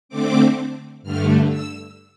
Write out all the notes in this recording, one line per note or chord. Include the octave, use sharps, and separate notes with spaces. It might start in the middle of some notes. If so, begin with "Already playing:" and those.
D3 A3 C4 D6
G2 D3 A3 F6
E6